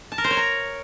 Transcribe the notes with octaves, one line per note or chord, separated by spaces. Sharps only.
A5
A#4
C5
C#5
A#5